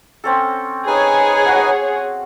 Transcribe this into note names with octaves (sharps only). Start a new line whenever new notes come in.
C4 C#4 A4
D#4 G#4 B4 C#5 G#5
F#4 F5 F#5